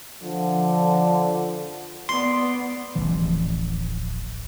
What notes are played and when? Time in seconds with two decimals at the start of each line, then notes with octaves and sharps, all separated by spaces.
0.23 D3 F3
2.09 B3 D5 C6
2.95 D1 A1 E3 F3